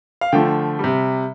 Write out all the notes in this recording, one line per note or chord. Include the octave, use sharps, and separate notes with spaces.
F5
D3 F3 A3 G5
C3 G3